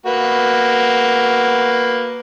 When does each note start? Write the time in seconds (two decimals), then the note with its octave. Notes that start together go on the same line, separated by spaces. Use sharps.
0.06 A#3 F#4 B4